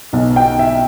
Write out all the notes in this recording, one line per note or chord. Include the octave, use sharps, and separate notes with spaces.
B1 B2
G5
E5